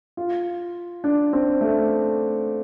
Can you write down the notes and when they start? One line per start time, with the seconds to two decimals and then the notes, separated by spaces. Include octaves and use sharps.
0.17 F4
1.04 D4
1.33 C4
1.61 A3